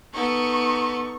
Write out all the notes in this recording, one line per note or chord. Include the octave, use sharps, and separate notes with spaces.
B3 D#4 A4 C#6